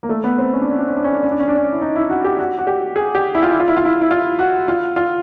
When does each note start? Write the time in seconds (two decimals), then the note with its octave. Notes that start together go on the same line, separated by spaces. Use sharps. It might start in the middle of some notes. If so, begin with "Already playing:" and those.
0.03 A#3
0.09 A3
0.24 B3
0.38 C4
0.53 C#4
0.61 D4
0.70 C#4
0.79 D4
0.88 C#4
0.96 D4
1.04 C#4
1.13 D4
1.23 C#4
1.31 D4
1.40 C#4
1.48 D4
1.56 C#4
1.72 E4
1.82 D#4
1.96 E4
2.10 F#4
2.24 G4
2.39 F#4
2.59 F#4
2.67 G4
2.96 G#4
3.15 G4
3.35 E4
3.43 F4
3.51 E4
3.60 F4
3.68 E4
3.77 F4
3.85 E4
4.01 E4
4.11 F4
4.39 F#4
4.68 F4
4.96 F4